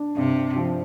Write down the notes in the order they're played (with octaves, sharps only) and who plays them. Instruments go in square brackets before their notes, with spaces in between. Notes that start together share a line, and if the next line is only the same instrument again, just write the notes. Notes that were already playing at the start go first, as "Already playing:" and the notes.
Already playing: [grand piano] D4
[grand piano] G2 [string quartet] C3
[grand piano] F3